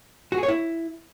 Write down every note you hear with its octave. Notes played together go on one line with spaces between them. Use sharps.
F#4
G#4
C#5
E4